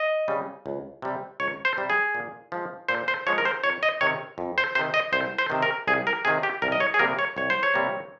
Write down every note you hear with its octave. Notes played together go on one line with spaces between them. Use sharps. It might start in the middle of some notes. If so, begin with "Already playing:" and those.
Already playing: D#5
C#3 G3
C#2
C3 G3
C#2 C#5
C5
C3 G3
G#4
A#2
F3 G#3
A#2 C5
C5
F3 G#3 C#5
A#4
C5
F2 C#5
D#5
C3 D#3 C#5
F2
C5
C3 D#3 C5
D#5
C2 C5
C5
C3 D#3
A#4
C2 G#4
A#4
C3 D#3 G#4
G4
C2 A#4
D#5
C#5
G#4
C3 G3 A#3 A#4
C#5
C2 C#5
C5
C#5
C3 G3 A#3